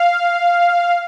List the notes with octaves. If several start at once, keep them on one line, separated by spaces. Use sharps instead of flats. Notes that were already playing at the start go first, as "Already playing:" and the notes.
Already playing: F5